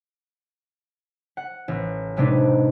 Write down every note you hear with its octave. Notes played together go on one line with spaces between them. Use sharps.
F#5
A1
A2 C3 G#3 B3 D4 D#4